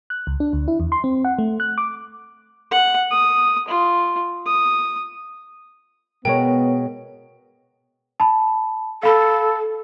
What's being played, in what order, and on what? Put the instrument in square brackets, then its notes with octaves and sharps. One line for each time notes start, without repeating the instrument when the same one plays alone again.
[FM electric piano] F#6
C#2
D4
D2
E4
E2
C6
C4
F#5
A3
F#6
D6
[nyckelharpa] F#5
D#6
F4
D#6
[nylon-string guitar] B2 G#3 [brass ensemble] B3 [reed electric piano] A#4 C#5 [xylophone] G5
[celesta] A5 B5
[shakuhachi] A4 [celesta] F5 B5